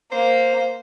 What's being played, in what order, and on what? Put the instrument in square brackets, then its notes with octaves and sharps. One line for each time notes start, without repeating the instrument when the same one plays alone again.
[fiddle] A#3 [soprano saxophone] C5